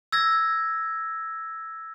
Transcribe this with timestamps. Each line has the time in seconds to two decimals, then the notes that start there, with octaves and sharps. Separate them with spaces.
0.12 E6 G#6 A#6